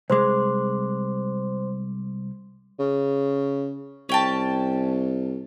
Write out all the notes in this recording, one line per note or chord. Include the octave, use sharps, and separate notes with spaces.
C2 G#3 C5 C6 D6
C#3
C2 C#4 G5 A5